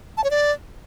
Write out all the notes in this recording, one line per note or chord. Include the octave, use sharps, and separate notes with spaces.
A5
C#5
D5